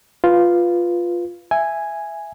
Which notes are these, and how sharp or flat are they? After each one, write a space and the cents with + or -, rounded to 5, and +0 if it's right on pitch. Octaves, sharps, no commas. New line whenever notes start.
F4 +0 B4 +0
E5 +10 G#5 -5